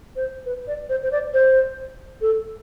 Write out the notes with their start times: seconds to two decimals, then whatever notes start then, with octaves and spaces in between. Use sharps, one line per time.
0.16 C5
0.46 B4
0.67 D5
0.89 C5
1.03 C5
1.12 D5
1.33 C5
2.21 A4